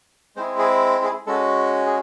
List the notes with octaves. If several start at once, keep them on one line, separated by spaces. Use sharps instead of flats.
G#3 C4 E4 G#4 C5
G#4
G#4
G#3 C#4 F#4 A4
G#4